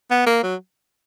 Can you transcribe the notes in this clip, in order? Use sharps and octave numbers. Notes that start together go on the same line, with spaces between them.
B3
A#3
F#3